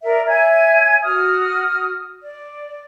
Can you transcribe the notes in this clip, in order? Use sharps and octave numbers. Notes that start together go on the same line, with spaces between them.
A#4 D5 E5
C#5 E5 G#5 G#6
F#4 D#6 F6
D5